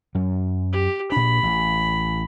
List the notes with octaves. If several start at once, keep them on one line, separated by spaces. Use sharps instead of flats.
F#2 F#3
G4
A#2 D4 B5
A1